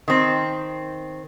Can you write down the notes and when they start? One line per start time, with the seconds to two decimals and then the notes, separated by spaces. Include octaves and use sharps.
0.08 D#3 C4